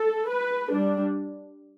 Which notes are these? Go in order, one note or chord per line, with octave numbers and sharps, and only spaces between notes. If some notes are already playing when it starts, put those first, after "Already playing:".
Already playing: A4
B4
G3 D4